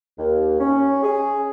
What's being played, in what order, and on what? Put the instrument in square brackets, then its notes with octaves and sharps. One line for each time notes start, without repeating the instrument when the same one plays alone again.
[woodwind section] D#2
C#4
G#4